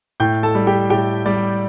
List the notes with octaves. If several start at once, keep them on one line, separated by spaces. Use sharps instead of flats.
A2 G5 G6
A4 A5
G3
G4 G5
A2 G4 G5
G3 D5